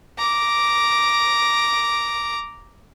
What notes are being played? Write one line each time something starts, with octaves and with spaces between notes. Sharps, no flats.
A#5 D6